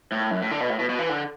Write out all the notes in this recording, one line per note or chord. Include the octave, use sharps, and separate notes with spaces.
A2
F#2
A2
D3
B2
A2
B2
B2
E3
D3